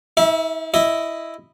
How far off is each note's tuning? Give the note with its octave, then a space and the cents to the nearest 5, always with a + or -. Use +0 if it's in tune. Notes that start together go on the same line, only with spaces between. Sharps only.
E4 -45 E5 +0
E4 +0 D#5 +0